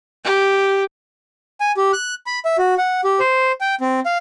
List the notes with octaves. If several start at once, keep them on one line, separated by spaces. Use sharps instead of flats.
G4
G#5
G4
F#6
B5
E5
F#4
F#5
G4
C5
G5
C4
F5